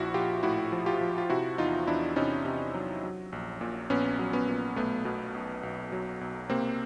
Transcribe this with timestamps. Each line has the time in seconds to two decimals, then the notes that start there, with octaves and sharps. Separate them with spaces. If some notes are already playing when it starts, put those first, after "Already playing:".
Already playing: A#1 F3 E4 F#4
0.14 A#1 F4 G4
0.43 A2 E4 F#4
0.72 F3
0.86 F4 G4
1.01 F3
1.18 F4
1.30 C3 E4 F#4
1.58 E2 D#4 F4
1.87 E2 D4 E4
2.16 C3 C#4 D#4
2.45 C3
2.74 F#3
3.03 F#3
3.32 A#1
3.61 A#2
3.90 A#1 B3 C#4
4.19 F#3
4.33 B3 C#4
4.48 A#2
4.76 B1 A3 B3
5.05 B2
5.34 B1
5.63 B1
5.92 F#3
6.21 B1
6.50 C3 A#3 C4